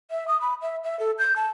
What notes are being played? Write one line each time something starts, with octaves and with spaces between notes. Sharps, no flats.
E5
D#6
B5
E5
E5
A4
G6
A5